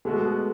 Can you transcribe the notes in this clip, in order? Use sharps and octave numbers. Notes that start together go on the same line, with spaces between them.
B2 G#3 A3 B3 F#4